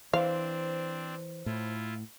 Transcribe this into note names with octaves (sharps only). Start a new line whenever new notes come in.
E3 C4 D4 C5 F5
A2 E4 F4